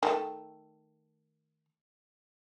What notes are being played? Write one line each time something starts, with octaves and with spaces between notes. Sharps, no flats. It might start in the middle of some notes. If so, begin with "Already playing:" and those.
D#3 G#3 A3